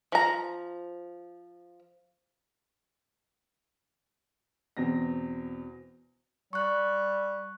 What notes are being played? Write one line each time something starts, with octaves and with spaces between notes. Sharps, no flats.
F3 A#5
E2 B2 C4 A#6
G3 C#6 F#6